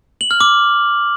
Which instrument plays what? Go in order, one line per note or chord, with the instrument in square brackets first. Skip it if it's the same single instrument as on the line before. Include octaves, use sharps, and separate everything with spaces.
[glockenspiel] F#7
F6
D6